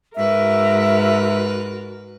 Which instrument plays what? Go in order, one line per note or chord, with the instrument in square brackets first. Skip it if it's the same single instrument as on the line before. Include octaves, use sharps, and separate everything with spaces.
[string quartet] G#2 B4 [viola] F#4 A#4 [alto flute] E5